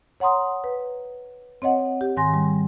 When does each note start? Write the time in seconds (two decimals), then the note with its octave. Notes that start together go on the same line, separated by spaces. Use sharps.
0.20 C#5 F#5 A#5 C6 D#6
0.64 B4
1.62 C4 C#5 D#5 F#5
2.01 G4
2.17 G#2 D#3 G#5 C6 A#6
2.34 G3